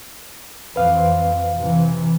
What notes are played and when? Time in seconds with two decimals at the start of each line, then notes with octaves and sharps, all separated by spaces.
0.76 F2 E3 C4 B4 F5
1.58 C3 E3